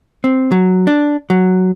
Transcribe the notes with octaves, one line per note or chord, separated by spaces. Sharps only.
C4
F#3
D4
F#3